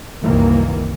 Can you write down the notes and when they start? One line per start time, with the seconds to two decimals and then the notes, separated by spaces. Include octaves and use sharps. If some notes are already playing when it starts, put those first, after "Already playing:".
0.22 C2 F#2 C3 D#3 E3 A#3